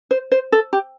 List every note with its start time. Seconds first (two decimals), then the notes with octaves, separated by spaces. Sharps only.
0.11 C5
0.32 C5
0.52 A4
0.73 G4